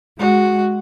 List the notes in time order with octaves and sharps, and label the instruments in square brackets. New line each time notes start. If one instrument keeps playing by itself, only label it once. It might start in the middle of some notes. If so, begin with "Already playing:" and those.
[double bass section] G#3 [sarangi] F#4